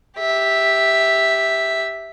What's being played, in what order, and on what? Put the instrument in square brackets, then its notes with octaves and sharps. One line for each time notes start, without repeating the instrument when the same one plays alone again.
[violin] G4 E5